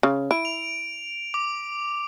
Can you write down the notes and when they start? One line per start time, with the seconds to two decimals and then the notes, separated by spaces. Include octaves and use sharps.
0.03 C#3
0.31 E4 D7
0.45 F7
1.34 D6